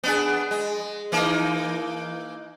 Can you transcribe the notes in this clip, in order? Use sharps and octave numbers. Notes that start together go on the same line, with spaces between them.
B3 D4 G#4
G#3
E3 A#3 D#4